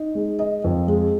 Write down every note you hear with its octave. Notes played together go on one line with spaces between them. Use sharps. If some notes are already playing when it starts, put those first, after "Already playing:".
Already playing: D#4
G#3
D#5
F2
G#3